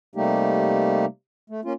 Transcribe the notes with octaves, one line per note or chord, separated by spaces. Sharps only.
C3 G3 A3 A#3 D#4 G4
A3
A#3 C#4 F4